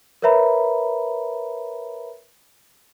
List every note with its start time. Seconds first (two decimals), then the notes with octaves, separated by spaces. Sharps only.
0.22 A#4 B4 C#5 E5 A#5 B5